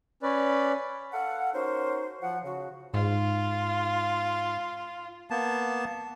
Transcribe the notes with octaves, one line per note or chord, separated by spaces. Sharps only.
C#4 B4 D5
A4 F5 F#5
C#4 D#4 F#4 A#4 C5
F3 F#5
C#3 F#4
G#2 F4
A#3 B3 A5